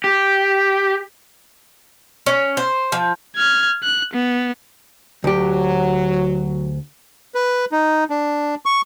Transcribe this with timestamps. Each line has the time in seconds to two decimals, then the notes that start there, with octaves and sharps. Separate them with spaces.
0.04 G4
2.26 C#4
2.57 C5
2.92 F3
3.36 F6 G#6
3.84 F#6
4.14 B3
5.24 D2 F#3 G4
7.35 B4
7.72 D#4
8.10 D4
8.65 C#6